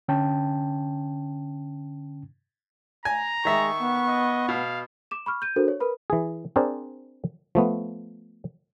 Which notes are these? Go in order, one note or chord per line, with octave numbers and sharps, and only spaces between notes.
D3 C#4 G5 A5
G#5 A#5
D#3 G#3 E5 C#6
B3
D#5
B2 F5
D6 E7
B5 C#6 F6
G6 D#7
D4 F#4 A4 A#4 C5
C#5
A#4 B4 B5
E3 G#4
C4 D4 G#4 A#4 C5 D5
F3 A3 B3